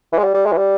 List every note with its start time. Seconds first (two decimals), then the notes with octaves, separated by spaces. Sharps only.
0.12 E3
0.18 G#3
0.24 G3
0.34 G3
0.46 G#3
0.53 E3
0.57 G3